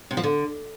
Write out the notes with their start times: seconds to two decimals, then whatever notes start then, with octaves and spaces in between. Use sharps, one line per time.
0.11 C3
0.17 F3
0.23 D3